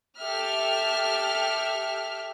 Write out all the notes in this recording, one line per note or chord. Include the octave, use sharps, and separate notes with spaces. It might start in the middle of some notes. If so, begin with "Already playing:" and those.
G4 A4 E5 F6